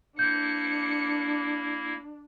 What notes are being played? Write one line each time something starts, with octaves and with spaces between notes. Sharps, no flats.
A#3 D4 E4 G6 C#7